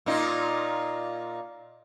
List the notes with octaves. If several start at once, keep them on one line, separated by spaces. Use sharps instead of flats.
A#2 D#4 F4